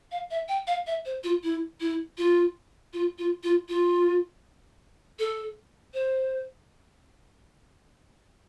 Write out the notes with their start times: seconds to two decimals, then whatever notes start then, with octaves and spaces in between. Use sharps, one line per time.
0.12 F5
0.31 E5
0.49 G5
0.67 F5
0.87 E5
1.05 C5
1.24 F4
1.43 E4
1.80 E4
2.18 F4
2.93 F4
3.18 F4
3.43 F4
3.69 F4
5.19 A4
5.94 C5